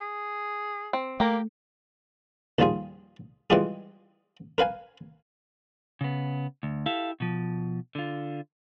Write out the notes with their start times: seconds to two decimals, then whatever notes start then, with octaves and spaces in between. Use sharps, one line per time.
0.01 G#4
0.93 C4
1.20 A3 A#3 G4 A#5
2.58 D#2 F3 G3 F4 G#4
3.50 E3 G3 G#3 F4 G4 G#4
4.58 A#4 B4 F5 G#5
6.01 C#3 B3
6.63 D2
6.86 E4 G4 A4 F5
7.20 B2 F3
7.95 D3 F4